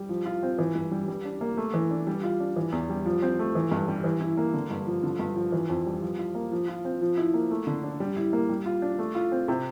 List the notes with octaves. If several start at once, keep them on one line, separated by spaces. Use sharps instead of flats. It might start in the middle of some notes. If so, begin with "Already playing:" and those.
Already playing: G3
F3
F4
C4
E3
G2
G3
G3
D4
A#3
A3
E3
D4
G3
F4
D4
E3
E2
G3
F3
C4
A3
E3
G2
G3
E3
E4
A#3
D3
G2
F3
D3
G2
F3
E3
F2
G3
F3
F4
A#3
F3
F4
C4
F3
E4
A#3
A3
D3
D4
G3
E4
A#3
G3
F4
D4
A3
F4
C4
C3